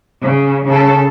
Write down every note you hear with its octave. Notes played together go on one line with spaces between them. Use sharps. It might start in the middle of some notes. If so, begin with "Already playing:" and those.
C#3
C#3 A4